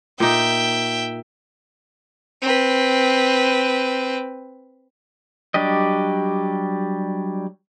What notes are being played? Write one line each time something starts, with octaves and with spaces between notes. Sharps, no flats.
A#2 D#4 E5 G5
C4 B4
F#3 G3 D4 G4 D#5